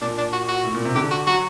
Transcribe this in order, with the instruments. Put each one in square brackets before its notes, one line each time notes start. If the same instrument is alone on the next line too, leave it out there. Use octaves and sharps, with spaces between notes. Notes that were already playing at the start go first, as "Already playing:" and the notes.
[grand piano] A#2 [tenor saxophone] D4
[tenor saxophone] D4
F#4
F#4
[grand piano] A2
A#2
C3
[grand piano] D3 [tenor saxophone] G4
[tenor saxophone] F#4
[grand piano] F#3 [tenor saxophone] F#4